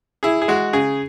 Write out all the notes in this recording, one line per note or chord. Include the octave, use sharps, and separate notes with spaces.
E4 G#4
G#4
G#3 F#4
C#3 G#4